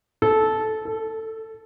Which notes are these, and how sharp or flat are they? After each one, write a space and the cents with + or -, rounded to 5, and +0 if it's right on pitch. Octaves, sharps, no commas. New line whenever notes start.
A4 -15
A4 +15